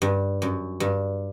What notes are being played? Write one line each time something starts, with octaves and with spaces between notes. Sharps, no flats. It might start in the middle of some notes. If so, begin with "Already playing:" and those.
G2
F#2
G2